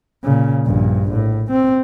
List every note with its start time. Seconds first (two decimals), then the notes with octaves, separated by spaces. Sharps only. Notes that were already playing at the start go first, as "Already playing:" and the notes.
0.24 A#2 C#3
0.65 A#1 G2
1.13 A2
1.51 C4